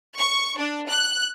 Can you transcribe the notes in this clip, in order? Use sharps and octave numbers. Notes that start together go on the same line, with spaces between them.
C#6
D4
F#6